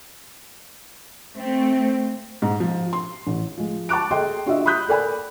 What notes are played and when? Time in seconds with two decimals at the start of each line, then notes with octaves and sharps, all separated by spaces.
1.36 A3 C4
2.42 G#2
2.60 F3
2.93 C6
3.27 A1
3.57 F3 G#3
3.89 A5 C#6 D6 F#6 D7
4.11 G#4 A4 D#5 G5 C6
4.46 D4 F4 F#4 D#5 E5
4.66 B5 C6 D#6 F#6 G6 B6
4.88 A4 A#4 D5 G#5 B5